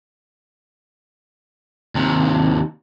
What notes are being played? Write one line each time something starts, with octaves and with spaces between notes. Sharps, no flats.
D#2 C3